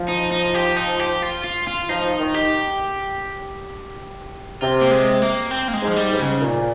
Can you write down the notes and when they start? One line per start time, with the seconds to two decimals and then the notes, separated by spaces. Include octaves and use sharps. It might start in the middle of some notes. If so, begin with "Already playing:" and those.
Already playing: F3
0.08 D#4
0.31 D#4
0.55 G4
0.77 D#4
1.00 G4
1.23 F4
1.44 F4
1.67 F4
1.89 F3 D#4
2.19 D#3
2.34 G4
4.61 C3 F4
4.81 A#3
4.91 G#3
5.22 A#3
5.51 C4
5.68 A#3
5.74 G#3
5.82 G#2
5.88 F3
5.96 G3
6.12 G#2
6.19 C#3
6.41 A#2